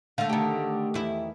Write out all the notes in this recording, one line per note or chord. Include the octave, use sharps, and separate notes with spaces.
D3 A3 F5
D#3 G4
E2 E4